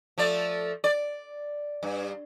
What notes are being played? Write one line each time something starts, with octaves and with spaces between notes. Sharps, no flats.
F3 A3 D5
D5
G2